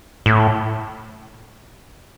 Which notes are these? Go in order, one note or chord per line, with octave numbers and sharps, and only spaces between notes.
A2